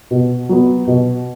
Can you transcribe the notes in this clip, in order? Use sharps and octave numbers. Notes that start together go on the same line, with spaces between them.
B2
F#3 B3
B2